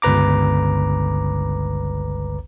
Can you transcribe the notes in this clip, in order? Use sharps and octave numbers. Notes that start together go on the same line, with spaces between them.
G1 C#2 B4 A#5 D6